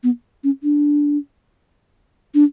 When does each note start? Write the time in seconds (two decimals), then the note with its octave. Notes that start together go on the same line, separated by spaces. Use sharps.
0.03 B3
0.44 C#4
0.63 D4
2.35 D4